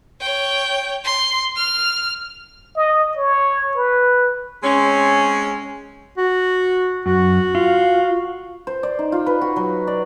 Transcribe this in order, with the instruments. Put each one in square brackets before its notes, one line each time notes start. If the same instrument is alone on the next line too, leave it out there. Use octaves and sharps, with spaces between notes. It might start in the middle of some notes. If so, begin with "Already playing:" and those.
[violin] C#5 G5
C6
F6
[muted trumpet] D#5
C#5
B4
[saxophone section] G#3 C4 C#4
[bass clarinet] F#4
[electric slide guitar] F#2 [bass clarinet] F#4
[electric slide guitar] F4
[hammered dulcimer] C5
D5
D#4
F4
B4
F#4
F#3
D5